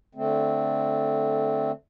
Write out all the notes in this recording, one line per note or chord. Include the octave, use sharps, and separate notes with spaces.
D3 A3 C4